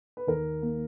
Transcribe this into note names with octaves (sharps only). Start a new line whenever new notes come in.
B4
D#2 A#4
A#3